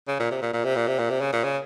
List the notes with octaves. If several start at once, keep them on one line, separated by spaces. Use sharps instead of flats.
C#3
A#2
C3
A#2
A#2
C3
A#2
C3
A#2
C3
C#3
A#2
C#3